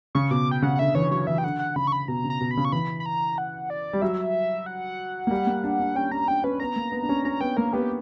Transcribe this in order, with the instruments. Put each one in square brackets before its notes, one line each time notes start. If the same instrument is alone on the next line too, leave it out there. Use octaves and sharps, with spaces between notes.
[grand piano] C#3 [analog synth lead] C#6
[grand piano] B2 [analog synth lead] D6
[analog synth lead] G5
[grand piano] C#3 [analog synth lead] F#5
[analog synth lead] F#5
[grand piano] D3 [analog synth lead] E5
[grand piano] E3 [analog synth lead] C#5
[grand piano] F#3 [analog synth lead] C#5
[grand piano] E3 [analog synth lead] E5
[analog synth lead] G5
[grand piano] D3 [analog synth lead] F#5
[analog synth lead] F#5
[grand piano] C#3 [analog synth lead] B5
[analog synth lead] C#6
B5
[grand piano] B2 [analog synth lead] A#5
[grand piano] C#3
[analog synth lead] A#5
[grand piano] B2
[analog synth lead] B5
[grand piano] C#3
[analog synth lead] C#6
[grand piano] E3 [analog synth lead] B5
[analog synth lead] B5
A#5
F#5
D5
[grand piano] G3
[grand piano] F#3 [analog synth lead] E5
[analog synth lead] F#5
[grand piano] A#3
G3
A#3
D4
D4
[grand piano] C#4 [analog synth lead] G5
[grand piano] D4 [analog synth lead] A#5
[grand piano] D4 [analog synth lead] G5
[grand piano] C#4 [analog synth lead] B4
[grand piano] B3 [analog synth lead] A#5
[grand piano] A#3
B3
D4
C#4
[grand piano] C#4 [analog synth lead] A#5
[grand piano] B3 [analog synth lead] G5
[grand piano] A#3 [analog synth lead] A#4
[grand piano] B3 [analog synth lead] G4